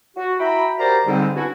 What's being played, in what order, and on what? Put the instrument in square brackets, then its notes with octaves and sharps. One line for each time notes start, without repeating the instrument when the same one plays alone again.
[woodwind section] F#4
E4 F#4 E5 G5 A#5 B5
F#4 G4 A#4 C5 D5 A#5
G#2 D3 G3 C4
F#2 B3 C#4 D4 E4 F#4